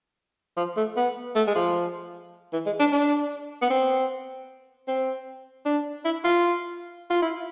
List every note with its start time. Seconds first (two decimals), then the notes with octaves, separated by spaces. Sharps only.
0.57 F3
0.77 A3
0.96 B3
1.35 A3
1.47 G#3
1.55 F3
2.53 E3
2.66 G#3
2.79 D4
2.92 D4
3.62 B3
3.70 C4
4.87 C4
5.65 D4
6.05 E4
6.24 F4
7.10 F4
7.22 E4